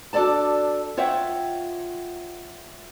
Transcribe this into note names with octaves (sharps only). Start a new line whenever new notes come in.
D4 F#4 A4 D5 A5
F4 C#5 E5 F#5 G5